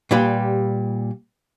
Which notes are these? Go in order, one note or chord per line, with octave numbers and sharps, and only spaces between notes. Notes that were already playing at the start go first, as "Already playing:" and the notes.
A#2 G3 G4 B4